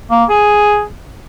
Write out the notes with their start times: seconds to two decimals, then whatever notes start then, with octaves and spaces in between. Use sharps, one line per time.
0.11 A#3
0.30 G#4